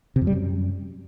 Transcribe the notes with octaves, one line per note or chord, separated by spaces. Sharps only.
C3
F2
G3
F#2